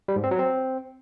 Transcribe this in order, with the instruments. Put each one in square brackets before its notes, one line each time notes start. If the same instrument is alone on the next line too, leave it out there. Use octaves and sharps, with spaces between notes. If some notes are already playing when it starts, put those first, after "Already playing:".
[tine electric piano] G3
G#2
C4
F#3
C4